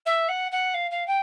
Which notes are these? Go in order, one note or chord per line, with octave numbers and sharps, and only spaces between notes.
E5
F#5
F#5
F5
F5
G5